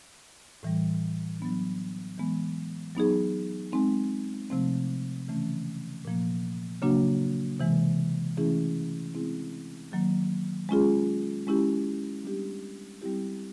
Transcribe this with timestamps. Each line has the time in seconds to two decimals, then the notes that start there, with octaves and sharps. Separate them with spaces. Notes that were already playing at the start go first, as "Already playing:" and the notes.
0.63 A2 E3 G3
1.40 F#3 B3 D4
2.18 E3 G#3 B3
2.95 F#3 B3 D#4 G#4
3.72 G#3 C4 D#4
4.50 C3 F3 A3 C4
5.28 C#3 E3 A3 C#4
6.05 A#2 F3 A#3
6.82 C#3 F#3 A#3 D4 F#4
7.60 C3 E3 G#3
8.37 E3 A3 C#4 E4 G#4
9.15 G#3 C4 E4 G#4
9.92 D#3 F#3 A#3
10.69 G#3 C#4 F4 G#4
11.47 G#3 C#4 E4 G4
12.24 G3 B3 D4 G4
13.02 G3 C4 E4 G4